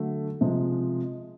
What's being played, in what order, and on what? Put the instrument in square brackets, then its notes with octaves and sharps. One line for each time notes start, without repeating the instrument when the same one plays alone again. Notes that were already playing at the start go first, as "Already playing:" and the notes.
Already playing: [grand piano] D3 F#3 A3
C3 F3 G#3